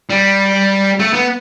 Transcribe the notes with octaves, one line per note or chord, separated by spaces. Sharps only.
G3
A3
B3